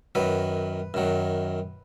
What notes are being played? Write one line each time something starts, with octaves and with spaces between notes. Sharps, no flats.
F#2 D#3 F#3 B4
F#2 D#3 F#3